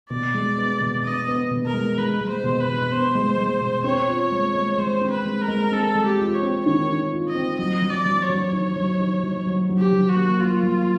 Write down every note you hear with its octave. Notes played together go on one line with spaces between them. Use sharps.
B2 D5
G#3
B3
B2
B3 D#5
B3
B2
A#4
G#3
G#3 B4
G#3
C5
B2
B4
B2
B3 C5
G#3
G#3
B2
C4 C#5
F4
G#3
G#3
G#3 C5
C4
B4
G#3
A#4
G#3
C4 A4
G#3
G4
F4
C#5
C4
D#3 C#5
D#3
F4
D#5
C4
F#3 D#5
F#3
D5
F#3
C#5
F#3
D#4
F#3
D#4
F#3
F#3
F#3
G4
F#3
F#4
A#3
A#3 F4
F#3